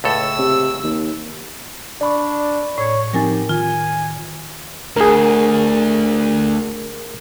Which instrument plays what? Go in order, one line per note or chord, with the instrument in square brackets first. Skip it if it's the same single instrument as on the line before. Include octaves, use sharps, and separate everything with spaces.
[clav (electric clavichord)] C#2 A2 A4 [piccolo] E6
[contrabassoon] C3
D#2
[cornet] D4 [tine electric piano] D5 B5 C#6
[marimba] A2 [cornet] C#5
[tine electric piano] F3 C4 D#4 [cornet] G4 [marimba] A#4 G#5 A6
[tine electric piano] D#3 [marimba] F4 [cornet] G#5
[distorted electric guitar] D2 [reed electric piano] G#4 A#4